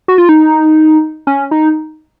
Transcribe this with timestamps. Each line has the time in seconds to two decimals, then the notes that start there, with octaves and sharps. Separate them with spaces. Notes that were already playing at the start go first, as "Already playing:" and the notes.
0.08 F#4
0.18 F4
0.29 D#4
1.27 C#4
1.51 D#4